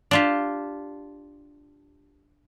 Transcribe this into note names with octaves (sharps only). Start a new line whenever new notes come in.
D4 F4 G4